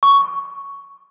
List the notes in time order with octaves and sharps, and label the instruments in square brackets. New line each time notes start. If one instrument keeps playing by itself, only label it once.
[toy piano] C#6